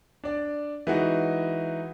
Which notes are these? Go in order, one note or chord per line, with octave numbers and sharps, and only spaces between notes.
D4 D5
E3 G#3 D#4 F#4